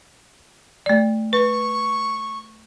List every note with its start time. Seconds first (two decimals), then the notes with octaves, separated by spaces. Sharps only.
0.86 A3 D5
1.33 B4 C#6